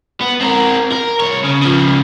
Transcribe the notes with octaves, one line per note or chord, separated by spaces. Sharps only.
B3
C4 A#4
A#4
C2 C#5
C#3
C#3 F3